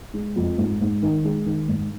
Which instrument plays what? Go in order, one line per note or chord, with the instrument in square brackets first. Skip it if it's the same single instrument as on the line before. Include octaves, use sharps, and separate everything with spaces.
[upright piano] G#3
F2
G#2
G#2
D#3
G#3
D#3
G#2